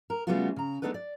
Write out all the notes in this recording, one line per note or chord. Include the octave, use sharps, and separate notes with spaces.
A#4
C#3 G3 A3 B3 F4 F#4
C#3 A#5
G#3 B3 D4 D#4 A4 B4
D5